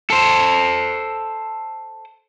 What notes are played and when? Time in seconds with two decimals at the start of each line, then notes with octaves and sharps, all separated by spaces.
0.10 A4 C5